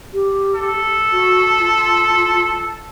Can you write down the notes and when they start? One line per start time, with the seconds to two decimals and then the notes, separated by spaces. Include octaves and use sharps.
0.13 G4
0.55 A4
1.11 F#4
1.59 F4